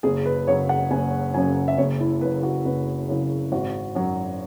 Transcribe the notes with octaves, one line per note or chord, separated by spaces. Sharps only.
F#1 G#4
B4
F#2 C#3 F#3 C#5
F#5
F#1 G#5
F#2 C#3 F#3 G#5
E5
F#1 C#5
E4
F#2 C#3 B4
F#4
F#1 B4
F#2 C#3 E4
G#1 F#4
F#2 F#3